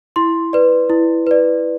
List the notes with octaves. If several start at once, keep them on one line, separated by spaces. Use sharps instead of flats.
E4 C6
B4 D5
E4
B4 D5